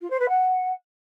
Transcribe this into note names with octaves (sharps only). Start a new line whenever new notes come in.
F4
C5
B4
F#5